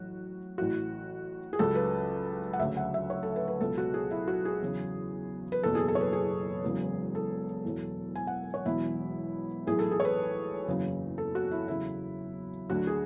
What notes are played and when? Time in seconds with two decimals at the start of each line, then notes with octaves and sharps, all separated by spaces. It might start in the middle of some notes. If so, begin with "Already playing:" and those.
Already playing: A1 A2 F#3 F#4
0.58 A1 A2 E3 F#4
1.53 G#4
1.59 C#2 C#3 F#3 A4
1.75 B4
2.53 F#5
2.59 D2 C#3 F#3 E5
2.77 F#5
2.94 E5
3.10 C#5
3.23 A4
3.36 B4
3.48 B4
3.61 C#2 B2 F#3 A4
3.78 F#4
3.94 G#4
4.11 E4
4.28 F#4
4.45 G#4
4.62 E2 C#3 F#3
5.52 B4
5.63 F#1 E2 B2 F#3 A4
5.75 G#4
5.88 A4
5.95 C#5
6.01 B4
6.13 G#4
6.64 E1 E2 C#3 F#3
7.15 A4
7.65 E2 B2 F#3
8.16 G#5
8.27 F#5
8.54 C#5
8.66 E1 E2 B2 F#3 E4
9.67 B1 A2 E3 G#4
9.79 A4
9.91 G#4
10.00 C#5
10.05 B4
10.68 F#1 E2 C#3 F#3
11.18 A4
11.35 F#4
11.51 E4
11.68 E2 C#3 F#3 E4
12.69 D2 D3 F#3 F#4
12.87 G#4